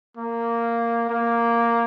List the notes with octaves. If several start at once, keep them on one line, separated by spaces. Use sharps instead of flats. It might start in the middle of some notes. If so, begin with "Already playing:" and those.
A#3
A#3